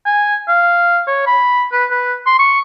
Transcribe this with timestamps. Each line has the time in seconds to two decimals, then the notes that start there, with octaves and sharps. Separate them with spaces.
0.06 G#5
0.48 F5
1.07 C#5
1.26 B5
1.72 B4
1.91 B4
2.26 C6
2.39 C#6